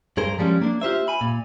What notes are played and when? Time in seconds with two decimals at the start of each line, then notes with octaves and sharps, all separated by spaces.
0.17 G2 G#4 A#4 C5
0.38 F3 G3 G#3 C#4
0.61 A#3 D4
0.81 F4 G4 C5 E5
1.08 G#5 B5
1.21 A#2